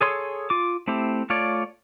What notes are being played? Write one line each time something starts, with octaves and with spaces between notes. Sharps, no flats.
G#4 A4 C#5 C6
F4 D6
A3 C4 E4 G4
A3 F4 C#5 D5